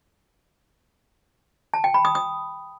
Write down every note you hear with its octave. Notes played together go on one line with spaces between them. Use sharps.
A5
G5
B5
D#6
D#6